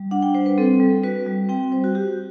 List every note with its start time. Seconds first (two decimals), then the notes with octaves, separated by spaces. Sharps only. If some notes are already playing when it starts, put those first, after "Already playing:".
Already playing: G3
0.11 D4 F#5
0.22 G5
0.34 G3 C5
0.46 B4
0.58 C4 A4
0.80 G3
1.04 F#4 B4
1.26 G3
1.49 C4 G5
1.72 G3 C5
1.84 F#4
1.95 F#4 G4